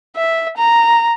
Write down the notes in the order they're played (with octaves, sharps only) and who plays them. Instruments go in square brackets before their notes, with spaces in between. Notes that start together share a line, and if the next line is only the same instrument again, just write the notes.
[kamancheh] E5
A#5